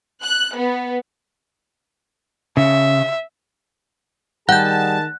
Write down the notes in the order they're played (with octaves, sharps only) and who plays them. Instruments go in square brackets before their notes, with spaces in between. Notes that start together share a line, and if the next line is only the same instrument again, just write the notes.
[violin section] F#6
B3
[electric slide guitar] C#3 [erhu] E5
[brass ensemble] D#3 G#4 A5 [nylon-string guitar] G3 [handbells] F#5 G6 [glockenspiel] F#6